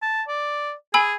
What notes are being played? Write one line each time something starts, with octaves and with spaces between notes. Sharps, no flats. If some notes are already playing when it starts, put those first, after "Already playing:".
A5
D5
G#4 G#5 B5 E6